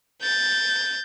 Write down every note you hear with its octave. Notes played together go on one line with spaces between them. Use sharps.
G6 A6